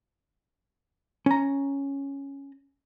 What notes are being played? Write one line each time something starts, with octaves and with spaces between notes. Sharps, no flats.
C#4 A#5